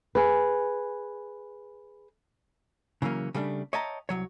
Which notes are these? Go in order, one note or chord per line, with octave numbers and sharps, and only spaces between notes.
G#4 B4
C#3 E3 F#3 A#3 C#4
C#3 G3 A3 C4 D4
C#5 D#5 E5 G5 A5 A#5
C2 F#3 C#5